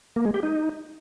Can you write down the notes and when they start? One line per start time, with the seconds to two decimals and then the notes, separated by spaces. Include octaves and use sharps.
0.16 A#3
0.25 G#3
0.34 G4
0.43 D#4